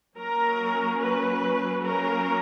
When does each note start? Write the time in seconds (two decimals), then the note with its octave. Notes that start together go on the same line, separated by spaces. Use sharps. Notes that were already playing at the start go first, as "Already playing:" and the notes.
0.18 F#3 A#3 C#4 A#4
1.00 B4
1.83 F#3 A#3 C#4 A#4